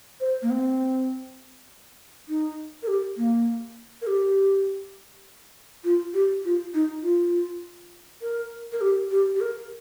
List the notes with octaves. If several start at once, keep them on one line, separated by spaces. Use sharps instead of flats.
C5
A#3
C4
D#4
A#4
G4
A#3
A#4
G4
F4
G4
F4
D#4
F4
A#4
A#4
G4
G4
G4
A#4